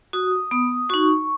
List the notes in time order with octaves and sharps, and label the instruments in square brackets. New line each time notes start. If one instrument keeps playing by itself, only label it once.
[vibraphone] F#4 D#6
B3 D#6
D#4 F#4 C#6